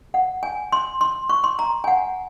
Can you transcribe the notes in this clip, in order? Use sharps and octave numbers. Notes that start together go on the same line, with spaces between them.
F#5
G#5
C6
C6
C#6
C6
A#5
G#5
F#5